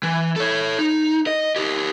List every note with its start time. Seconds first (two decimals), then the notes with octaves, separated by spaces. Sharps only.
0.03 E3
0.36 A4 C#5
0.79 D#4
1.27 D#5
1.56 G4 A#4